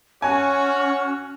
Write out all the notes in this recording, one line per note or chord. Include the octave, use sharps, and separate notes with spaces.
C#4 F#4 C#5 G#5